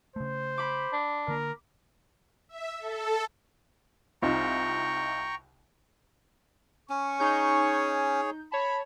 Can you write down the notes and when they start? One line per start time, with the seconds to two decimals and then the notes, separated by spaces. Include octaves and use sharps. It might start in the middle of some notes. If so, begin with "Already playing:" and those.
0.16 C#3 A3 C5
0.58 B5 D6
0.93 D4
1.28 D3 A#3 A#4
2.49 E5
2.79 A4
4.22 C2 D#4 F4 G5 A#5 C#6
6.90 C#4 C#6
7.20 D#4 G#4 C#5 G6
8.52 C#5 A5 B5